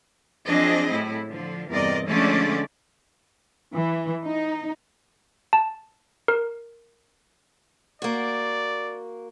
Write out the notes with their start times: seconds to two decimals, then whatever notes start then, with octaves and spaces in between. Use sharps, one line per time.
0.46 F3 F#3 C4 D4 G#4 D#5
0.90 A2 E4
1.28 D3 F3
1.70 E2 G2 C3 A#4 D5 D#5
2.09 D3 F3 G#3 A3 C#4 D5
3.73 E3
4.24 D#4
5.53 A5
6.28 A#4
8.02 A#3 F#4 D5